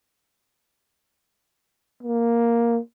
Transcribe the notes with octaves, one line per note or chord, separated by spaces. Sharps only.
A#3